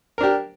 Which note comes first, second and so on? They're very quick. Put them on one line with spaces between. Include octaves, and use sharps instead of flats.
A#4 D4 G4